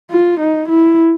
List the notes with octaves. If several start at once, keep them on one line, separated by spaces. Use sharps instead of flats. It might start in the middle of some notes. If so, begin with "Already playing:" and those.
F4
D#4
E4